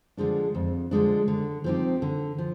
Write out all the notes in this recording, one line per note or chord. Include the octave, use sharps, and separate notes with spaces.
D3 F3 G#3 D4
F2
D3 F3 G#3 D4
D3
F3 C4 D#4 G4
D3
F3